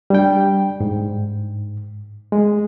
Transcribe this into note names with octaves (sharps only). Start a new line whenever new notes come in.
G3 D4 G5
G#2
G#3